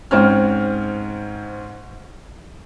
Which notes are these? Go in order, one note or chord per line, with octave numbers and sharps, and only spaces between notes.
G#2 C4 C#4 F6